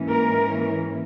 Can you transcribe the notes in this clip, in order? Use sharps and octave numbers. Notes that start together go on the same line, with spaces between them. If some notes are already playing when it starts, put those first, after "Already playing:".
Already playing: G#2 E3 A#3 C#4
A#4